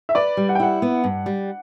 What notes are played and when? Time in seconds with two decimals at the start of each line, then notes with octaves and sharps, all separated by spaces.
0.09 E5
0.15 B4 D5
0.37 G3
0.49 F#5
0.55 G5
0.60 E4 F#5
0.82 B3
1.04 G2
1.26 G3